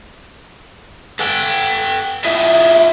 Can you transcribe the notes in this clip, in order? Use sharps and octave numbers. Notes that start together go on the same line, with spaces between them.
A4 F#5 G5
E4 F4 D#5 E5